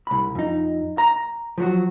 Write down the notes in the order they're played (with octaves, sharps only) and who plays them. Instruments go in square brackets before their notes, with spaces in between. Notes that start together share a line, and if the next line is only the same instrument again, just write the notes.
[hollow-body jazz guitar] C2 B5
F2 D#4
A#5
F3 F#3 F#4